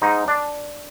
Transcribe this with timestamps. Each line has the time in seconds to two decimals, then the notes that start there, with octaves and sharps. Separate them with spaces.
0.02 G#2 D#4
0.28 D4